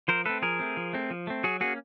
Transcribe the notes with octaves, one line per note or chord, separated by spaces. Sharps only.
F3 A#4 C5
A3 C4 A4 B4
F3 G#4 A#4
A3 C4
F3
A3 C4
F3
A3 C4
F#3 F#4 G#4
A#3 C#4 F#4 G#4